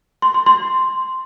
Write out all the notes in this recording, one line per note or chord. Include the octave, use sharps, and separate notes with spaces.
C6
C6
C6